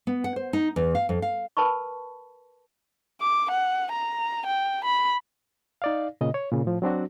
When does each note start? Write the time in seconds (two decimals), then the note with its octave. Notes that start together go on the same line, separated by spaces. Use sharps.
0.07 B3
0.24 F#5
0.36 C5
0.53 D#4
0.76 E2
0.95 F5
1.09 F2
1.22 F5
1.57 A#4 B4 A5 B5 C#6
3.21 D6
3.51 F#5
3.92 A#5
4.46 G5
4.84 B5
5.82 D#4 D5 F5
6.21 A#2 C#3 D#5
6.34 C#5
6.52 A#2 C#3
6.64 A2 F3
6.82 F#3 C4 D4 F#4